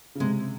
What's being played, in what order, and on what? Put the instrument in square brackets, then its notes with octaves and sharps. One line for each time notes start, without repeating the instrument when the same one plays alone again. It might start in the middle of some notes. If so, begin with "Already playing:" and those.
[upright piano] C#3
[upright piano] C3 [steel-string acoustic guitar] G#3